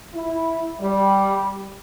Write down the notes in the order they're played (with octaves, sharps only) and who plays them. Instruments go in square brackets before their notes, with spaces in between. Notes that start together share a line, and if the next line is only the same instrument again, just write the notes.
[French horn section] E4
G3